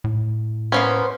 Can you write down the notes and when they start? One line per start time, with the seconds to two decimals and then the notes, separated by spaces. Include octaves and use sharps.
0.04 A2
0.72 A#3 B3 C#4 C5